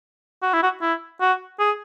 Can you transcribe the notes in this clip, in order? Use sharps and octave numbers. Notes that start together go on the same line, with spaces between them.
F#4
E4
F#4
E4
F#4
G#4